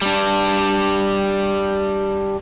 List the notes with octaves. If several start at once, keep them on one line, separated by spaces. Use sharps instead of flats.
G3 D4